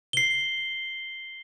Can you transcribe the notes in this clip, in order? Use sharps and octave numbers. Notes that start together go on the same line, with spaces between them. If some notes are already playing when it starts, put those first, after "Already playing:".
C7 G7